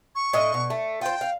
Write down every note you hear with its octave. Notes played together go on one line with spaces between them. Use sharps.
C#6
A2 D4 D#5
B2
A3
F4 C5 G5
F5